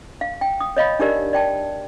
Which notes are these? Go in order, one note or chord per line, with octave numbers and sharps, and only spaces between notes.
F5
G5
D#6
C#5 D#5 F5 B5
D4 D#4 G4 A#4 D5
D5 G5 A5